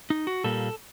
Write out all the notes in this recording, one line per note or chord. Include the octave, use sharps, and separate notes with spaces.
D#4
F#4
A#2 G3 A#3 A4